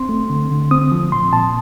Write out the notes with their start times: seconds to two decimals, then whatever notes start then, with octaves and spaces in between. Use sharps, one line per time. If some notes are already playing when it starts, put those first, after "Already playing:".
Already playing: C4 C6
0.09 A3
0.30 D3
0.51 D3
0.71 C4 D#6
0.92 F3
1.12 A#2 C6
1.33 A#2 A5